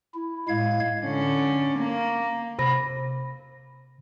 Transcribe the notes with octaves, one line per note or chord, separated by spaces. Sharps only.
E4
A2 G#3 F5 G#6
D3 C#4
A#3
C3 B5 A#6